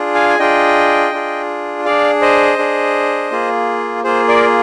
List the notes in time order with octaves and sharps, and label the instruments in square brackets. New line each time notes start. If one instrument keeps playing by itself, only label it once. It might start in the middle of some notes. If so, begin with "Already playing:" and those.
Already playing: [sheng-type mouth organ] D4 F4 G#4
F5 G#5
G#5
D4 F4 G#4 D#5 G5
D4 F4 G#4
D4 G#4 D5 F5
C5 D#5
D4 G#4
A#3 F4 G#4
A#3 F4 G#4 C5
A#4 D5